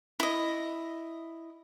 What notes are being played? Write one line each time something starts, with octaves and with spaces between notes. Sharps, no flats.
E4 D#5